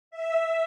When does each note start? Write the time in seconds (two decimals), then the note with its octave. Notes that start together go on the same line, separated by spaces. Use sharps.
0.11 E5